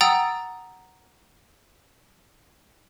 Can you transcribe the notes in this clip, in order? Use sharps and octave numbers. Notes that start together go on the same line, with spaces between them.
F#5 G5 A#5 D#6 E6 A6